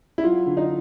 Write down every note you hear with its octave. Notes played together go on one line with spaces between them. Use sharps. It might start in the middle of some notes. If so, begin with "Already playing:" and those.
E4
F#3 F4
D3
D#4